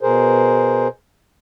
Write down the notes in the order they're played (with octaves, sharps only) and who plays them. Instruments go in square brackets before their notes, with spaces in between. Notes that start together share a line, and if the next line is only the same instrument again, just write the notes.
[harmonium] B2 G#4 A#4 C5